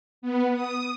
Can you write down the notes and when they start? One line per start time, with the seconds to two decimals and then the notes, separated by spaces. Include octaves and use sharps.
0.22 B3
0.54 D#6